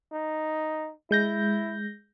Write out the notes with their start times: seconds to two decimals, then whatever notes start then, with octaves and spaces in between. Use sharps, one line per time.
0.13 D#4
1.11 G#3 E4 G6 A#6